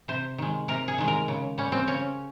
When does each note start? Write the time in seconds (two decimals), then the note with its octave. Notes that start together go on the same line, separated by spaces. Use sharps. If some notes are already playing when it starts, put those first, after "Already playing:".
0.08 C3 C5
0.38 D#3 G#3
0.68 C3 A#4
0.88 G#4
0.98 D#3 G#3
1.08 A#4
1.28 C#3
1.58 G3 C#4
1.72 C4
1.87 C#3 C#4